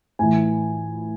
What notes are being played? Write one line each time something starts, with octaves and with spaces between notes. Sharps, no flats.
A2 E3 G#5